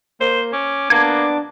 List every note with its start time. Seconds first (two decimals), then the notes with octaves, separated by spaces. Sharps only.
0.21 A#3 C5
0.53 C#4 D6
0.90 A#3 B3 D4 G#6